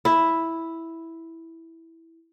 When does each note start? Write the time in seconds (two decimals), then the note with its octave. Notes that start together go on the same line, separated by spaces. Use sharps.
0.05 E4 E5